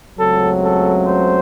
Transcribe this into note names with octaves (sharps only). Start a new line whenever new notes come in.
C#2 C#3 F#3 A3 C4 A4
A4
C5